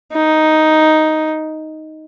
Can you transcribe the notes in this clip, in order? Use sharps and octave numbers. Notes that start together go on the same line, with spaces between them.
D#4